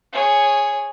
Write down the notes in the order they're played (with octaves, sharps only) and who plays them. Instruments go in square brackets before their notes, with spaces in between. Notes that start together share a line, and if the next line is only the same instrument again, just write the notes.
[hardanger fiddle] G#4 C#5